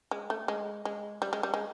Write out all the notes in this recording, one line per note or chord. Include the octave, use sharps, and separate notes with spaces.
G#3
A3
G#3
G#3
G3
G#3
G3
G#3